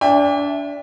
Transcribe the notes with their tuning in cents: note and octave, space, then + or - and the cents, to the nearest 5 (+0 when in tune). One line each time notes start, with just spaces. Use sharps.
D4 -25 E5 +0 G5 +40